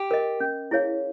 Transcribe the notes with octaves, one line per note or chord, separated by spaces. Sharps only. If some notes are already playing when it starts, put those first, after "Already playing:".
Already playing: G4
A#4 D#5
C#4
E4 G#4 C#5 F5